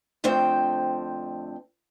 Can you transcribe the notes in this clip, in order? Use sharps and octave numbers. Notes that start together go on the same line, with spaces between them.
F2 D3 A3 C4 C5 G5